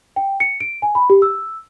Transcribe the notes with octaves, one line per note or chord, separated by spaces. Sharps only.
G5
C#7
D7
G#5
B5
G4
E6